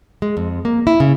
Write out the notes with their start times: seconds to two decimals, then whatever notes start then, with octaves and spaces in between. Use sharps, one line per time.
0.22 G#3
0.37 F2
0.65 A#3
0.87 E4
1.00 C#3